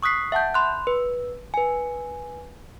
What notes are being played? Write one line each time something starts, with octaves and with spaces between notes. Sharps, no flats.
C#6 D#6 F#6 B6 C7
E5 F#5 A5 G6
B5 C6 F#6
B4
B4 G#5